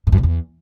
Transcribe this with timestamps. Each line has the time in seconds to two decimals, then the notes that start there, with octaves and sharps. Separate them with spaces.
0.07 G#2
0.12 F#2
0.18 C3
0.23 E2